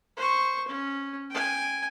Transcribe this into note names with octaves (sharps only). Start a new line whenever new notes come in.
C5 C#6
C#4
G5 G#5